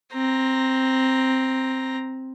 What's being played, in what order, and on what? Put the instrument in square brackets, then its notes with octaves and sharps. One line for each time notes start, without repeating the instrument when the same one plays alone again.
[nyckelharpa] C4 A#5